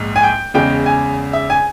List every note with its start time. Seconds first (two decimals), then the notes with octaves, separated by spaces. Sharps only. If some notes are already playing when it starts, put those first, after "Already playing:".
Already playing: A#1 G#2
0.16 G#5
0.23 G5
0.54 E2 C#3 G#3 G5
0.86 G#5
1.33 E5
1.50 G#5